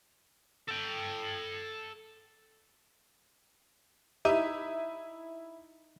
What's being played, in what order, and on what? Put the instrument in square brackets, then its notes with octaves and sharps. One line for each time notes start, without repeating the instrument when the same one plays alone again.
[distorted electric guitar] A4 G5
[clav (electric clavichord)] D#4 [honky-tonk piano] E4 D#7 [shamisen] G4 B4 E5